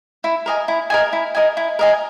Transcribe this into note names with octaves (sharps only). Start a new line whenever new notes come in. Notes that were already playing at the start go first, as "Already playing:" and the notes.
E4
A#4 D#5 G#5
E4
A#4 D#5 G#5
E4
A#4 D#5 G#5
E4
A#4 D#5 G#5